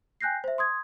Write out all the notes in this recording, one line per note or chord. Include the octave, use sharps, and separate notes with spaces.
G5 G#5 F#6 G6 A#6 C7
C5 E5
C6 D#6 G#6